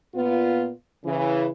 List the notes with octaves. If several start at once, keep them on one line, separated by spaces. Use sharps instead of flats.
A#2 B3 F4
C#3 E3